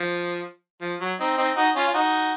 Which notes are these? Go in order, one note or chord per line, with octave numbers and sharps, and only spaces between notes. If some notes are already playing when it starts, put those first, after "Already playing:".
Already playing: F3
F3
F#3
C4 D#4
C4 D#4
D#4 F#4
C#4 F4
F4
D#4 F#4